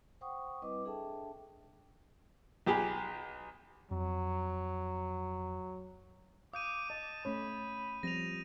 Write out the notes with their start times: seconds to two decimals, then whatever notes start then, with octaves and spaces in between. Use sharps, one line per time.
0.21 C5 F#5 G5 C#6 D#6
0.62 G3 C4 E4 B4 D#5 D6
0.85 D4 G#4 A4 E5 G5 A5
2.66 B1 G4 G#4 B5
3.91 F2 F#3
6.53 F5 D6 D#6 G6 D#7
6.90 D#5 A5
7.25 A3 C#4 C#5 B5
8.03 F3 G3 C4 A#6 D#7 F7